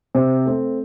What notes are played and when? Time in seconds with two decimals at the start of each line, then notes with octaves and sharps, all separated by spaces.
0.15 C3 C5
0.46 A3 C4